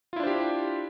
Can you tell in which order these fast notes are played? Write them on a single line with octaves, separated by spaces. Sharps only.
F4 E4 D4 C5 G4